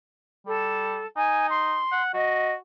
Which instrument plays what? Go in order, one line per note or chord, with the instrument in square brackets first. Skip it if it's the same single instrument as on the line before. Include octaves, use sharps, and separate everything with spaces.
[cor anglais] G3 [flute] A4
[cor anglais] D#4 [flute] G#5
[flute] C6
[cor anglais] F#5
[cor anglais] F#4 [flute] D#5